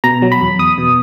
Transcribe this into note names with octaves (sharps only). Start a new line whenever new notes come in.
B2 A#5
F#3
B5
E2
E2 D#6
B2